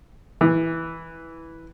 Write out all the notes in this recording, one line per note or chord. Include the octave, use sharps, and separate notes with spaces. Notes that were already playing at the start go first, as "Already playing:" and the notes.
E3